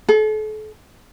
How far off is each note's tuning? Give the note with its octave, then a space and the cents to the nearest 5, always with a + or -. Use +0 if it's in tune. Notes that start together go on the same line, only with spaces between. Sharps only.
A4 -40